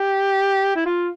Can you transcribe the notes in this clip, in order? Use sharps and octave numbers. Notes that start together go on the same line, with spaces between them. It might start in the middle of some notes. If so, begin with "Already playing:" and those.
Already playing: G4
E4
F4